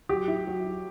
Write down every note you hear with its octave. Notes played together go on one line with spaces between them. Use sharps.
F#3 G4
E4
F#3
E4